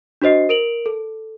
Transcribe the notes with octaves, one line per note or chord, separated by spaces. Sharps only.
D4 F#4 C5 D#5 C7
A#4 D7 F7 F#7
A4